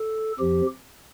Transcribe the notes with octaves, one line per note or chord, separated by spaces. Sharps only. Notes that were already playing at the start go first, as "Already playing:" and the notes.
Already playing: A4
F2 F3 G4